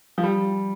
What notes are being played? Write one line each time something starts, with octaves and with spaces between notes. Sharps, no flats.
F3
G3